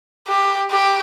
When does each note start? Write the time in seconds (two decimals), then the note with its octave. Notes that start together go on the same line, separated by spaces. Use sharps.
0.28 G4
0.72 G4